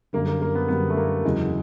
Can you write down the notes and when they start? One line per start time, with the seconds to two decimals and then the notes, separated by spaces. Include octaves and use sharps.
0.13 F#2 D3 G3 A#3
0.28 A#3
0.42 A#3
0.55 B3
0.68 F#2 D3 G3 B3
0.90 A3
0.97 A#3
1.24 E2 C#3 F#3 G#3